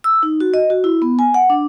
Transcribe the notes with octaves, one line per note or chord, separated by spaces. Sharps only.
E6
D#4
F#4
D#5
F#4
E4
B3
G#5
F#5
D4